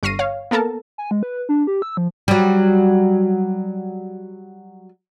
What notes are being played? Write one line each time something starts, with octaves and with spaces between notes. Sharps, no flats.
G1 C#6 F6 A#6 C7 D#7
C#5 F5
A#3 B3 A4 A#4 A5
G#5
G#3
B4
D4
G4
E6
F3
F#3 G3